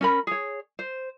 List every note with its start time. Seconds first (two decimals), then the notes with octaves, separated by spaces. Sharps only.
0.01 C#4 A#4 B5
0.27 G#4 C#5
0.79 C5